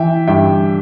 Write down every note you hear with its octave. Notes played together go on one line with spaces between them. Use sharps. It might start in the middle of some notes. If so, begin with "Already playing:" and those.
Already playing: E3 E5 G5
G2 E5 G5